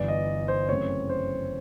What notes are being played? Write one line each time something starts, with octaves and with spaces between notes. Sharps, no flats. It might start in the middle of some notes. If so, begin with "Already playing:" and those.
Already playing: G1 G2 E3 D5
D#5
C5
F#2 C#3 E3 A3 C4 C#5
C5